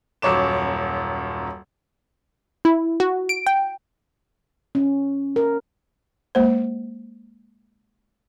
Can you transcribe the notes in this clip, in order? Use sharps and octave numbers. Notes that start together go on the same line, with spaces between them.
D#1 F#2 C#5 D6 E7
E4
F#4
D7
G5
C#4
A#4
G#3 A#3 C5